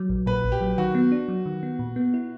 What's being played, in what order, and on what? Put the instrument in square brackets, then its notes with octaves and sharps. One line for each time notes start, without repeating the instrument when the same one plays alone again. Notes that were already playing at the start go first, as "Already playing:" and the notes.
Already playing: [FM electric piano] F#3
A#1
[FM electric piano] A#2 [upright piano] B4
[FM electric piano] A#1
[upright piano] G4
[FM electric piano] F#3
[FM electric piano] D#3 [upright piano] F#4
[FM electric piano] B3
D4
F#3
D#3
B3
A#2
B3
E4